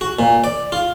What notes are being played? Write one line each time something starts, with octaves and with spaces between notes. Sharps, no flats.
F#4
A#2
D5
F4